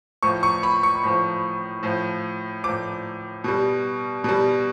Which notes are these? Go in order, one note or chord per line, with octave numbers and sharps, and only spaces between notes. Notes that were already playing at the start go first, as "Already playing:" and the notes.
A2 F3 C#6
C#6
B5
C#6
A2 F3
A2 F3
A2 F3 D6
B2 G3
B2 G3